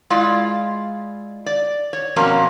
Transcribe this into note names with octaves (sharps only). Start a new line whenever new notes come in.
G#3 E4 F4 D5
D5
C#5
F2 B2 A#3 C#4 A#5